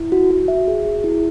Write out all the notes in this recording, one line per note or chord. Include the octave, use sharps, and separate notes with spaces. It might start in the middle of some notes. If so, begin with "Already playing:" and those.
Already playing: E4
F#4
F#4
E5
G#4
G#4
E4